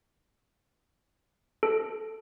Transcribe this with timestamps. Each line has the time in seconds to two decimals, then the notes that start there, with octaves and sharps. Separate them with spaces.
1.63 A4